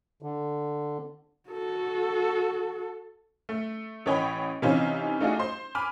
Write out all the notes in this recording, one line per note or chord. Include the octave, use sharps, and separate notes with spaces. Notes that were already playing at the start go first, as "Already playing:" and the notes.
D3
F#4 A4
A3
A1 E3 C#5 D#5 G5 B5
C3 E3 C#4 D#4 F4 C5
A3 D4 D#4 F4 F#4 G#4
C5 C6
G#5 B5 D6 F6